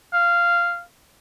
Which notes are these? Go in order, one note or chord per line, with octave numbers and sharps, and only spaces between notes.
F5